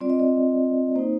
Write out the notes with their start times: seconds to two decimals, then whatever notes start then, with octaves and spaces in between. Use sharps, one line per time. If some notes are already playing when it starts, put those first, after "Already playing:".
0.01 G3 C4 F4 D5
0.10 D#5
0.20 D5
0.95 A#3 D#4 C5